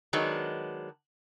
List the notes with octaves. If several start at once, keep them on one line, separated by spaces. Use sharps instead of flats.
D#3 F#3 G#3 B3 D4